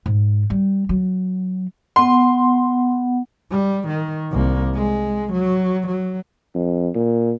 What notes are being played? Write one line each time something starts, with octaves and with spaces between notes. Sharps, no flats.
G#2
G3
F#3
B3 F#5 C6
G3
D#3
C2 A#3
G#3
F#3
F#3
F2
A#2